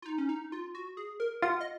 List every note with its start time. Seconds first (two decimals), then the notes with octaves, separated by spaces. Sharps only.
0.02 F4
0.06 D#4
0.18 C#4
0.29 D#4
0.52 F4
0.75 F#4
0.97 G#4
1.20 A#4
1.42 F4 F#5
1.60 D#5